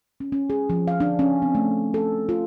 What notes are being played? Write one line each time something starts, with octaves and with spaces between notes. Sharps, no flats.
C#4
C#4
G#4
F3
F5
D4
C#4
C4
A3
A4
F4